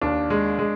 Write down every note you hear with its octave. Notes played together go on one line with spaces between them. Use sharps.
D#2 D4
G#3
G#3